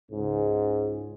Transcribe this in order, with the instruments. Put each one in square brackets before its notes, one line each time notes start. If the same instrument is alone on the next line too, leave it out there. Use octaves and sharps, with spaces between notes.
[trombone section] C#2 G#2